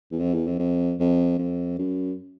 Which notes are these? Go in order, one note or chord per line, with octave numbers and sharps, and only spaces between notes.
E2
F2
E2
F2
F2
F2
F2
F#2